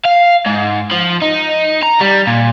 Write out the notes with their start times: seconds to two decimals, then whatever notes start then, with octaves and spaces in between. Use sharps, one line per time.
0.05 F5
0.46 G#2
0.92 F3
1.22 D#4
1.83 A#5
2.01 G3
2.27 A#2